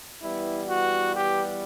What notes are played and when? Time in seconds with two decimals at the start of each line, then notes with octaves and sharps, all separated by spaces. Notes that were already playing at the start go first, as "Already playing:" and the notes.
0.21 E3 G3 B3 E4
0.69 F#4
1.16 G4